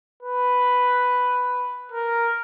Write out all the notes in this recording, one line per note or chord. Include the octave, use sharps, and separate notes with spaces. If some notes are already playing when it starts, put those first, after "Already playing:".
B4
A#4